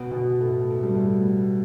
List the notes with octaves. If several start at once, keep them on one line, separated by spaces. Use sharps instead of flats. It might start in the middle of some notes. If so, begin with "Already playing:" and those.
Already playing: B2 B3
B2 B3
A2 A3
A3
G3
A2 A3